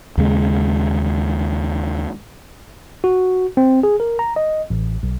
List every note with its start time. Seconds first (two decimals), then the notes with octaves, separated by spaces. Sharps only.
0.18 D#2 C#3 G#3
3.04 F#4
3.57 C4
3.83 G#4
4.00 A#4
4.19 A#5
4.36 D#5
4.70 A1
5.03 B1